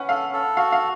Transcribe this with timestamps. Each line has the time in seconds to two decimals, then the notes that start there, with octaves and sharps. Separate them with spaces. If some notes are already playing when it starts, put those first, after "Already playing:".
Already playing: C#4 B4 F#5
0.09 A4 F5
0.33 A4
0.57 F#4 F5
0.72 F5